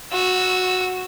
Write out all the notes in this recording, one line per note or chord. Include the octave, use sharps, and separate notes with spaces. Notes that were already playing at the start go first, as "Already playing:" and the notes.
F#4 E6